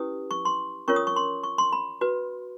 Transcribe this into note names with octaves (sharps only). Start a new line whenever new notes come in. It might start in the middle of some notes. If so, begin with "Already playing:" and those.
Already playing: C#4 E4 G4 B4 D#6
C#6
C6
C#4 F4 A#4 C#5 C#6
D#6
C#6
C6
C#6
C6
B5
F#4 B4